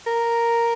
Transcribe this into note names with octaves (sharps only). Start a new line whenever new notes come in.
A#4